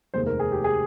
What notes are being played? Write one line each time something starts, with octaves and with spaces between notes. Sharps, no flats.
F1 D#2 D#3 G#3 C5
A#4
G#4
G4
G#4